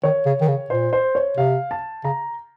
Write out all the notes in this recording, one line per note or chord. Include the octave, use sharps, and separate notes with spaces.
D#3 C#5
C#3
D#3
C#3
A#2 C5
C5
C#5
C3 F5
A5
C#3 A#5